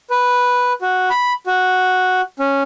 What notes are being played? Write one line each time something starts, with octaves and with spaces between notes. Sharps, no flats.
B4
F#4
B5
F#4
C#4